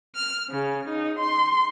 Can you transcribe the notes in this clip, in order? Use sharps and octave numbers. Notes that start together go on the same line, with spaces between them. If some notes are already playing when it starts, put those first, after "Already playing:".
F6
C#3
D#4
C6